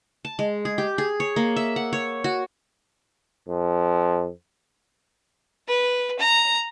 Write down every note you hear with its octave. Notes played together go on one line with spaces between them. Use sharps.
A5
G#3
G#4
G4
G#4
C#5
A#3
E5
F#5
C#5
F#4
F2
B4
A#5